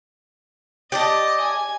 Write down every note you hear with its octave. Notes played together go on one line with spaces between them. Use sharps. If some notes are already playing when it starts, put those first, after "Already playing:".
G4 D5 D#5 A5
G#5